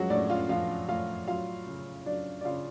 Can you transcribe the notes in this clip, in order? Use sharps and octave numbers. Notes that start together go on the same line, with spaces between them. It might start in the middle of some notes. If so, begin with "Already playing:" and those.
Already playing: F3 F#3 G#3 F#4 G#4
A2 D4 D5
F4 F5
F3 F4 F5
A2 F4 F5
F#3 F4 F5
C#3
F#3 D4 D5
D5
C#3 F4 F5